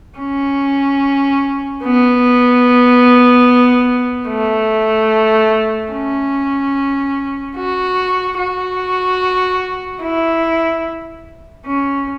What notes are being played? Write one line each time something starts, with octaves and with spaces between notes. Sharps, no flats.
C#4
B3
A3
C#4
F#4
F#4
E4
C#4